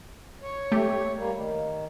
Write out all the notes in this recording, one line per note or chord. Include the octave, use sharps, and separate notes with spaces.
C#5
A3 G4
G3 A#3
D#3